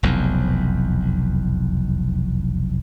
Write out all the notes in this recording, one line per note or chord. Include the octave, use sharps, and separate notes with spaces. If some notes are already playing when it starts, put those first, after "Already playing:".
F1 B1 E2